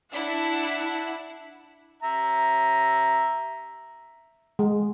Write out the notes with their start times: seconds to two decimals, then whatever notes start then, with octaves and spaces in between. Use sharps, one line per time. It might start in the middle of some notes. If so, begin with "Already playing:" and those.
0.10 D4 E4 E5 F#5
2.02 E5 A#5
4.59 G#3